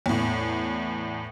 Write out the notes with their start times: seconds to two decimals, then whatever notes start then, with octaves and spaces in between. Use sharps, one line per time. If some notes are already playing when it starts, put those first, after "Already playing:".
0.06 E2 A2